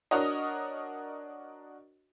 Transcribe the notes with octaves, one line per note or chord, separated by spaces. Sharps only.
D4 F#4 A#4 C#5 D#5